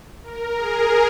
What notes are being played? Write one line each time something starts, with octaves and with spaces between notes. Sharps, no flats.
A#4
G#4